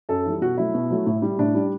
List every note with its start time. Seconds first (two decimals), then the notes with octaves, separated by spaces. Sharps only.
0.09 F#2 A4
0.25 E3 G3
0.41 B2 F#4
0.57 F#3 A3 E4
0.74 B2
0.90 F#3 A3
1.06 A2
1.22 G3
1.38 A2 D4
1.55 G3